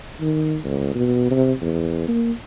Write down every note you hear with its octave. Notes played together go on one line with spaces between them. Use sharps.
D#3
C#2
B2
C3
E2
A#3